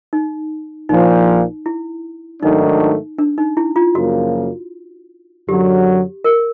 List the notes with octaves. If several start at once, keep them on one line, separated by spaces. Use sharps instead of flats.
D#4
A#1 A#2 F3 D#4
E4
G#2 D#3 F#3 A3 D4 D#4
D4
D#4
E4
F4
F#2 C#3 F3 A#3 F#4
F#2 D3 F#3 G4
A#4